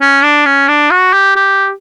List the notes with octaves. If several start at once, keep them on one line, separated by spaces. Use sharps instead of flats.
C#4
D4
C#4
D4
F#4
G4
G4